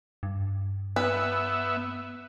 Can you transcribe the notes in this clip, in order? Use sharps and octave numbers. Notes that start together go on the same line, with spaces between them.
G2
B3 B4 E5